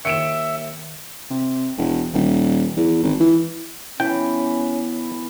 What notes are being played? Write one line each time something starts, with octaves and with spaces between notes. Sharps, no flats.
D#2 E5 C#7 D7 E7
C3
E1
D#1
E2
G#1
E3
E3 B3 C#4 G5 D6